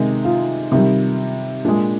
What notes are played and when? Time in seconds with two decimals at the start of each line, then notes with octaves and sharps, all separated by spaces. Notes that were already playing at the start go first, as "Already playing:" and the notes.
Already playing: C3 D#3 G#3 D#4
0.25 F4
0.72 C3 D#3 G3
1.65 A#2 G#3 D4